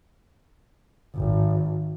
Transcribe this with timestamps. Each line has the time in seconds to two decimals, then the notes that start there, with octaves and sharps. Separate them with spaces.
1.15 G#1